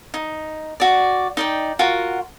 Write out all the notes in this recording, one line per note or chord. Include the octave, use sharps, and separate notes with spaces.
D#4
F#4 D5
D#4 D5 G5
F4 F#4 A#4 F#5